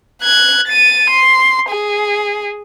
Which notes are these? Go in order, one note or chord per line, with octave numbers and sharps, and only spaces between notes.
F#6 G#6
A6 D#7
C6
G#4